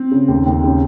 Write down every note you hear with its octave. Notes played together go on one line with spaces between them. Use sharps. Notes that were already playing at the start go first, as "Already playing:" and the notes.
Already playing: C4
C#3
D#2
D#2
C#3